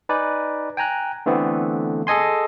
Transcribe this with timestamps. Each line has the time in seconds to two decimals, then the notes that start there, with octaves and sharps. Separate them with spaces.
0.09 D#4 B4 D5 G#5
0.77 G5 G#5 A#5 F#6
1.26 D3 E3 A3 B3 C4
2.07 G#4 A4 D#5 G#5 C6